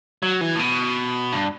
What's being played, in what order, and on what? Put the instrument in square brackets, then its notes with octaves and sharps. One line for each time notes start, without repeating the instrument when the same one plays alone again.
[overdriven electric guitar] F#3
E3
A2
B2
G2